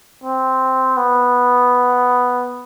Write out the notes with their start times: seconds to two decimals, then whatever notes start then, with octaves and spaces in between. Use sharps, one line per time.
0.24 C4
0.97 B3